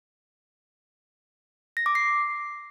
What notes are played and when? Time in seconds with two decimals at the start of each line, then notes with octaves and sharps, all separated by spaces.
1.77 A#6
1.86 D6
1.95 C7